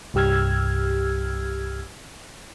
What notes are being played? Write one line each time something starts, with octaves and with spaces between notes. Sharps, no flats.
C2 G2 G4 E6 F6 G#6